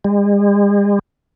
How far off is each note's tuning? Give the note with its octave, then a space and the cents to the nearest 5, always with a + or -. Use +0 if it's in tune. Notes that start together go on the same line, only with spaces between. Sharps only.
G#3 -45